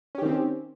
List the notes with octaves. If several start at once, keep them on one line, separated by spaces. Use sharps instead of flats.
D#3 C4 C#4 G4